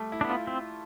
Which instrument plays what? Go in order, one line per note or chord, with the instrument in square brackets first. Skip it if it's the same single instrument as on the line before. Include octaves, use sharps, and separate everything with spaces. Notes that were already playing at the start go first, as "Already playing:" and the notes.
Already playing: [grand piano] G3 A3
E4
[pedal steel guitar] B3 D4
[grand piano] F4
[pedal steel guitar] C4